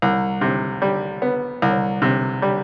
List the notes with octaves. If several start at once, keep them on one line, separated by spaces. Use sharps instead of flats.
C2
C3
G3
B3
C2
C3
G3